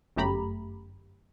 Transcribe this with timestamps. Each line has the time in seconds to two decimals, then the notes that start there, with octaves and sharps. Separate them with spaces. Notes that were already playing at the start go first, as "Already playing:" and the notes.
0.16 G1 F#2 A3 G4 A#5 B5